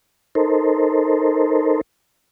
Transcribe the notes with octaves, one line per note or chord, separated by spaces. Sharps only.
D#4 A4 A#4 C5